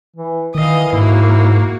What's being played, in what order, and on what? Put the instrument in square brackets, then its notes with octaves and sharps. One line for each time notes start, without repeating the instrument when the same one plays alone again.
[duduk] E3
[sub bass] D#3 [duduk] E3 [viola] D#5 F5
[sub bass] G#2 [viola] A#3 F#4 [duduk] E4